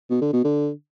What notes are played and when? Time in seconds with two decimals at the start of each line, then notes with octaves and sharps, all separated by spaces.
0.10 B2
0.22 D3
0.33 B2
0.44 D3